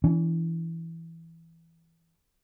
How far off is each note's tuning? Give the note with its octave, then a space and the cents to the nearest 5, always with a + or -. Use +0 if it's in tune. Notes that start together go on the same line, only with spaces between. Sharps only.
E3 +0 D4 -45